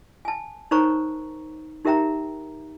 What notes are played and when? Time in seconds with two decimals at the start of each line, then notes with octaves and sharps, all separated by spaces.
0.25 G#5 A5
0.71 D#4 A#4 C5 C#5 A#5 C#6
1.85 D#4 G4 A#4 E5 G5 A#5